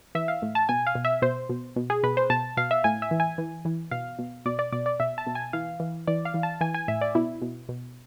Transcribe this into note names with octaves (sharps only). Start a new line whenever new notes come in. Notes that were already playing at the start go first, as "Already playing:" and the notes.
E3 E5
F5
A2
A5
B2 G#5
F5
B2
E5
B2 C5
B2
B2
G#4
B2 B4
C5
B2 A5
B2 F5
E5
A2 G#5
E5
E3
G#5
E3
E3
B2 F5
B2
B2 D5
D5
B2 D5
D5
B2 E5
A5
B2
G#5
E3 F5
E3
E3 D5
F5
E3
A5
E3 G#5
G#5
A2 E5
D5
B2 E4
B2
B2